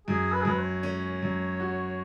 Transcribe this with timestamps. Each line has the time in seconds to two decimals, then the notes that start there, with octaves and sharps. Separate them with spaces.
0.07 F#2 G#4
0.32 B4
0.41 G#4
0.45 F#2 B4
0.58 C#5
0.83 C#4
1.23 F#2
1.60 F#4